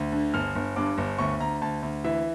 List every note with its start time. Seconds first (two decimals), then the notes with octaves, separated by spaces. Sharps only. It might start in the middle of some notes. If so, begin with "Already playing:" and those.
Already playing: D2
0.12 D3
0.34 G1 F6
0.55 G1
0.76 G2 D6
0.98 G1
1.18 D2 C#6
1.40 D2 A#5
1.61 D2 A5
1.82 D2
2.04 E3 E5